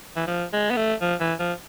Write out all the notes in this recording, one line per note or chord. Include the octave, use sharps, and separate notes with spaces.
E3
F3
G#3
B3
A3
F3
E3
F3